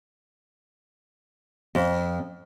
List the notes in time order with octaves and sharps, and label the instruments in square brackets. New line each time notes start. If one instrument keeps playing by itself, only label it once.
[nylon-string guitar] F2